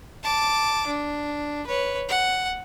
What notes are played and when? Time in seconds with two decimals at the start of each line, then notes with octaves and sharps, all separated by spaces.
0.23 A5 D6
0.87 D4
1.67 B4 C#5
2.09 F#5